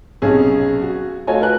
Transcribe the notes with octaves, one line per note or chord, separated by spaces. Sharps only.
B1 C3 C#4 G#4
F#4
A3 F4 F#4 C#5 D#5 G#5
A#4 B4 G#5 F#6